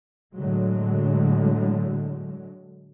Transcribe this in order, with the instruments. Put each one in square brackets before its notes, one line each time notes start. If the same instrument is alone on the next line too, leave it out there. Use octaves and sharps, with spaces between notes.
[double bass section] A2 D3 F#3 G#3